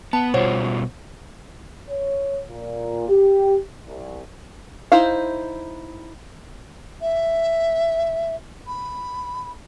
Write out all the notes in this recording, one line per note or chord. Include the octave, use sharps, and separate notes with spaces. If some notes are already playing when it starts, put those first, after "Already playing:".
B3 A5
B2 G3 F4 C5 C#5 F#5
C#5
A#2
G4
C2
D#4 E4 C5 F5
E5
B5